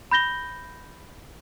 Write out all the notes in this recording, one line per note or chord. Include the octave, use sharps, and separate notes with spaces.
B5 G6 A#6 G7